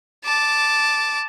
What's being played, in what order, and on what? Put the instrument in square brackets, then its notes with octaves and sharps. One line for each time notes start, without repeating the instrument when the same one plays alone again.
[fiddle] A5 D6